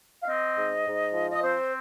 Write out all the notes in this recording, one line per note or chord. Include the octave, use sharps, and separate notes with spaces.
F5
C4 D#5
G#2
G#2
F3
D#5
C4 C5